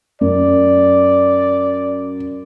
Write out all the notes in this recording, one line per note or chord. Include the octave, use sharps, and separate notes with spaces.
F#2 D5